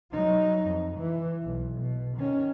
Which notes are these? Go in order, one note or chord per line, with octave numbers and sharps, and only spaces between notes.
F#3 D#4
F2
E3
B1
B2
D#3 C#4